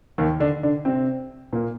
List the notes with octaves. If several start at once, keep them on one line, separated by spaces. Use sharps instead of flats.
D#2 D#3
D3 D4
D3 D4
C3 C4
A#2 A#3